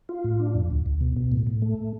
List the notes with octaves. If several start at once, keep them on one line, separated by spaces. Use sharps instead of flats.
F4
A2
D4
F2
D2
D2
B2
B2
A2
A2
A3